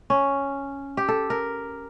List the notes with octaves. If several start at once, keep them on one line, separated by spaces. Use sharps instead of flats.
C#4
G4
A4
A#4